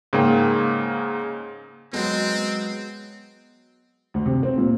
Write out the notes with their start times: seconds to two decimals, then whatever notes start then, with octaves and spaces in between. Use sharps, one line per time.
0.13 G#2 C#3 A#3 G5
1.93 F#3 G#3 B3 C4
4.14 D2
4.26 C3
4.43 C4
4.58 A#2